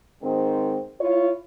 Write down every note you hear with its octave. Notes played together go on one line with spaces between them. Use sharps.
G#2 D#3 C4
E4 F4 C#5